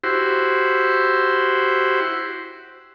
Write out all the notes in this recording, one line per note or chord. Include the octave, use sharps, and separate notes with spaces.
E4 F#4 G4 C5